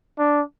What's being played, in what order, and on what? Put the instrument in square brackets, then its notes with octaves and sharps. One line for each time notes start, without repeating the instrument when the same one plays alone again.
[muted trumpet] D4